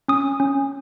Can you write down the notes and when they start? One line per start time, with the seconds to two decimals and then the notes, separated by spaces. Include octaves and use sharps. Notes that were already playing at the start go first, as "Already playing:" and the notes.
0.08 C#4 D#6
0.40 C#4